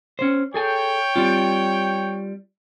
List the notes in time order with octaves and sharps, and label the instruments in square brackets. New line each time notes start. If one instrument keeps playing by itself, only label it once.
[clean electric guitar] C#4 C5
[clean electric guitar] G#4 A4 G#5 [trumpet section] C#5 G5
[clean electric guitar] G3 C4 F4